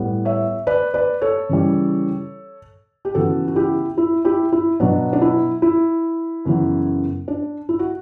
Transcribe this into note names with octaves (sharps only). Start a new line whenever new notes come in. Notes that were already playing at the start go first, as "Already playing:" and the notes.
Already playing: A2 G3 B3
C#5 E5
B4 D5
B4 D5
A4 C#5
C#3 E3 G3
G4
C#3 E3 B3 F#4 A4
F#4
E4 G4
E4
E4 G4
E4
B2 F#3 B3 D4
D4
E4
E4
F#2 C#3 E3 B3
D4
E4
F#4